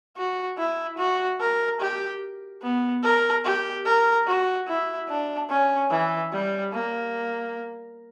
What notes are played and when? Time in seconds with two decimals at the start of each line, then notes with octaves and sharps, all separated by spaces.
0.17 F#4
0.58 E4
0.98 F#4
1.40 A#4
1.80 G4
2.62 B3
3.03 A#4
3.44 G4
3.85 A#4
4.27 F#4
4.68 E4
5.09 D4
5.50 C#4
5.91 E3
6.32 G3
6.73 A#3